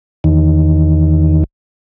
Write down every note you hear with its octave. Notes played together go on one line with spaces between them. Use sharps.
E2 D#3